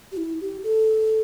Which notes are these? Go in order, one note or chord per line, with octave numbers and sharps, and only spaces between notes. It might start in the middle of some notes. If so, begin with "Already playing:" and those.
G4
E4
G4
A4